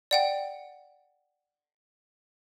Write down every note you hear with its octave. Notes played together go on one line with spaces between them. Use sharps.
D5 F#5 G5